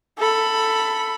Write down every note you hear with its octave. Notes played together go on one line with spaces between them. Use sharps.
A4 B5